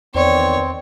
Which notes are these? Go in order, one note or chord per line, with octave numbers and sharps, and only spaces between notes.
E2 D#3 B3 C4 C#5 D5